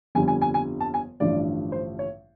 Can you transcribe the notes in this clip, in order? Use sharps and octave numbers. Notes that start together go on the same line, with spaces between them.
G1 F2 D3 G3 G#5
G#5
G#5
G#5
A5
G#5
A1 G2 D3 F3 D5
C5
C#5